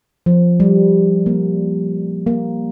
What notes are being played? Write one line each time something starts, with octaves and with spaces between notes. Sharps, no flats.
F3
G3
A#3
A#3